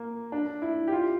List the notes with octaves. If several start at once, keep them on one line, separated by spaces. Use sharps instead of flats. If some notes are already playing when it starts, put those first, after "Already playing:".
Already playing: A#3
D4
E4
G4
F4